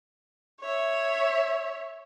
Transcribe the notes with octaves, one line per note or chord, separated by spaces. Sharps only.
C#5 E5